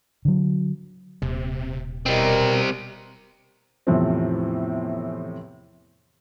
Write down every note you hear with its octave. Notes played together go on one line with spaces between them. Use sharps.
D3 F#3
D#1 C3
B2 G3 C4 A#4 D#5
E2 A2 C3 E3 F3 C4